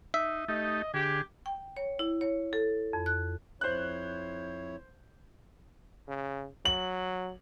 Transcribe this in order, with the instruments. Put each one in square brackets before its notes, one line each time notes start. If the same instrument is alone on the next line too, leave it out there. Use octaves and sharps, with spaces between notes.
[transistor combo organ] D#4 [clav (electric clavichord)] E5
[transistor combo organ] A3 D#4 G4 [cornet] D#5
[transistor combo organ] D3 G#4 [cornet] G4
[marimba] G5
C#5
E4
C#5
A4
F2
F#6
[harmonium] F2 E4 C#5 [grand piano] C5 F#6
[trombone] C#3
[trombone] F#3 [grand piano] F#7